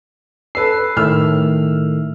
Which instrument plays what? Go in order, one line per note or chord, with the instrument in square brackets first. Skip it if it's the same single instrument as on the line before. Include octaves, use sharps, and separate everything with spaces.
[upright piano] A4 B4 E6 [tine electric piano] C7
[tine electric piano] A2 D#3 A3 [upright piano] E6 F6